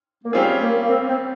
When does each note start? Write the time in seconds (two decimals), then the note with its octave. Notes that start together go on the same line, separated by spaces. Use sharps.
0.23 A#3
0.33 G3 C4 C#4 F4 G#4
0.62 A#3
0.81 A#3
0.90 C4
1.09 C4